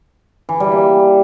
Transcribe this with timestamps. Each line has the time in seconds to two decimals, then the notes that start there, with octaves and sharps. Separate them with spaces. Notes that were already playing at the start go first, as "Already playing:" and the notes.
0.49 E3
0.60 G3
0.72 A#3